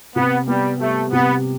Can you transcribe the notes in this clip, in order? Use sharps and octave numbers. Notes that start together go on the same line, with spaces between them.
C3 B3
G3 B3
G3 A3
C3 B3